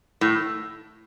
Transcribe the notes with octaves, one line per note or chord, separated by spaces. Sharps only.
A2